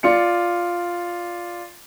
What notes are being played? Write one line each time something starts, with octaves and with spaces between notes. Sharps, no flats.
F4 D5 C#7